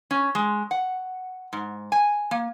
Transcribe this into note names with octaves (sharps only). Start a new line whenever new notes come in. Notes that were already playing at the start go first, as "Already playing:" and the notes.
C#4
G#3
F#5
G#2
G#5
A#3